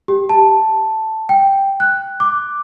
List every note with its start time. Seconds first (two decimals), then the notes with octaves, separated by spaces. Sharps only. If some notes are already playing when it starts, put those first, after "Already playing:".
0.08 G4
0.29 A5
1.29 G5
1.80 F#6
2.20 D6